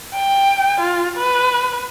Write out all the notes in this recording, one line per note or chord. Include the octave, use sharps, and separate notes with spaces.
G5
F4
B4